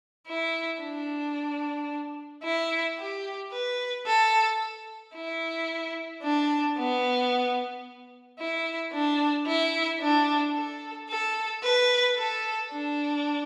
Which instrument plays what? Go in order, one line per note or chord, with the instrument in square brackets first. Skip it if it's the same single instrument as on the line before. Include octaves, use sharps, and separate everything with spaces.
[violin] E4
D4
E4
G4
B4
A4
E4
D4
B3
E4
D4
E4
D4
A4
A4
B4
A4
D4